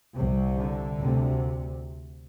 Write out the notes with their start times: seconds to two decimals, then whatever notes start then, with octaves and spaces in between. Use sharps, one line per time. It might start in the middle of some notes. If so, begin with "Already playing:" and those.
0.15 C2 C3
0.56 D3
0.96 D2 C3